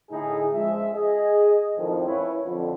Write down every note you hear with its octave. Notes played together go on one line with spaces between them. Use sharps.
A2 D3 D#4 E4 G#4
C#2 F3 G#3 E5
G#4 D#5
F2 A2 D#3 F3
C#4 E4 B4 C#5
F2 D3